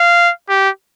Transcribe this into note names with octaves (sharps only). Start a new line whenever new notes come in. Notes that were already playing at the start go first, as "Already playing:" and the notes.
Already playing: F5
G4